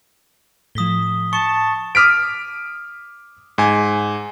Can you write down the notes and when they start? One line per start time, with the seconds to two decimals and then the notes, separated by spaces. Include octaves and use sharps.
0.75 A2 F3 D#6 B6 G7
1.33 A5 C#6 C#7
1.95 D6 D#6 F6 B6 D7
3.58 G#2 G#5